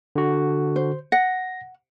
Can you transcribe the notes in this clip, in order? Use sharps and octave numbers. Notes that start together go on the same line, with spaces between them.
D3 F#4
C5
F#5 A#6